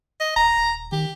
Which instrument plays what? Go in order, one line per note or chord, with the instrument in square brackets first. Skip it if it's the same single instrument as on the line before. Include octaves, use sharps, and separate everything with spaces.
[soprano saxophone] D#5
[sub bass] D#1 [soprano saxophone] A#5
[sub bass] D#1
[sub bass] D#3 [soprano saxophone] G4